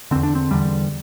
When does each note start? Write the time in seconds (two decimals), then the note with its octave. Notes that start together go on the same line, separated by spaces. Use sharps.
0.11 E2 D3 C4
0.23 D4
0.35 C4
0.51 E2 D3 G3